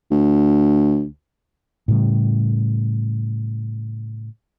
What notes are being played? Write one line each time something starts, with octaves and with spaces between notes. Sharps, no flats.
D2
A2 C#3 G3